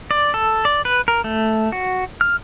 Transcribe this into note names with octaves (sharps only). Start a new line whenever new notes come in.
D5
A4
D5
B4
A#4
A3
F#4
F6